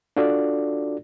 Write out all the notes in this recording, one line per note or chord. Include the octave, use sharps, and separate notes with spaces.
D4 F4 F#4 A4 D5